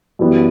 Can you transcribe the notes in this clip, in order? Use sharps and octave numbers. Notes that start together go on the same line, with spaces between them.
F#2 E3 G3 B3